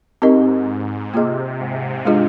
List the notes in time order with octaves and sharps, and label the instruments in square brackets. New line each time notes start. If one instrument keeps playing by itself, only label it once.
[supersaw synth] G#2 [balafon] C4 D#4 G4 A#4 D#5
[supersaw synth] C3 [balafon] A#3 F4 G#4 D#5
[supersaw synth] G#2
[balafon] G#3 D4 F4 G#4 D#5